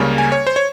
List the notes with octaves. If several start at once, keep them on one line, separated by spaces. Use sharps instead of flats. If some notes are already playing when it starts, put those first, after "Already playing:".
Already playing: C#2 C#3 G3 A#3 C#4
G#5
C#5
C5
C#5